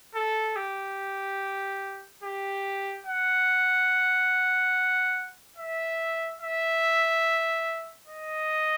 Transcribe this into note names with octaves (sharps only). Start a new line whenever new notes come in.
A4
G4
G4
F#5
E5
E5
D#5